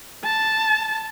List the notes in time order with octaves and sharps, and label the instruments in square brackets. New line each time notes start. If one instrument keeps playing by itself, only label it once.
[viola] A5